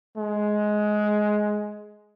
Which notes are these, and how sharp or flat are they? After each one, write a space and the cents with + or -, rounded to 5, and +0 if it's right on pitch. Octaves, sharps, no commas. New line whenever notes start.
G#3 +15